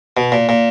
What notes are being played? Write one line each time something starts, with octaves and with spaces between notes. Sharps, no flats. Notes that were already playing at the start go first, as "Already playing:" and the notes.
B2
A#2
A#2